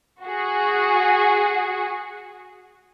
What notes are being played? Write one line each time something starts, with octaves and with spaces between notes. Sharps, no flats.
F#4 G#4